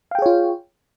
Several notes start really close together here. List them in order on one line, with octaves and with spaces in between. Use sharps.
F5 G5 G#4 C#5 F4